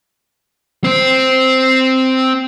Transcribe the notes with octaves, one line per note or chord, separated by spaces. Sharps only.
C4 C5